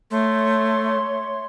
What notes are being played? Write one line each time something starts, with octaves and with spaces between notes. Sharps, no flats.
A3 C#5 E5 C6